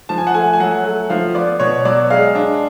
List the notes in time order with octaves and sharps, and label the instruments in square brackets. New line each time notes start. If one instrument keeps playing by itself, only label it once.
[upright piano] F3 A5
G#5
F#5
A3 G#5
G#5
F#3 F#5
A3
F3 F5
B3 D5
B2 C#5
F#3 D5
G#3 F5
D4